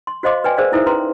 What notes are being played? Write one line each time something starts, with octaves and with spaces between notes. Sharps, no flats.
C6
F#4 C5 D#5 F5 C6 D6
B4 D5 G5 G#5
G#4 A#4 C5 D5 F5 G#5
D#4 E4 A4 A#4 C5 E5
C#4 B4 A#5 C6